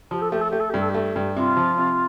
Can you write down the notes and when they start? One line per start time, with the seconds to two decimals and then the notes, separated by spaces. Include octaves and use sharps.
0.11 F3 G4
0.21 A4
0.31 A3 G4
0.41 A4
0.50 A3 G4
0.60 A4
0.70 G2 G4
0.79 A4
0.89 G4
0.94 A3
1.16 G2
1.36 C3 F4
1.57 F3
1.78 C3